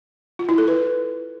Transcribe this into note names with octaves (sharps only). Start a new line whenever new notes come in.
F4
E4
A4
B4